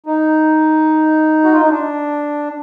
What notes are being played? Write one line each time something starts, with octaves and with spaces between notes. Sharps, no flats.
D#4
F#4
F4
D#4
D4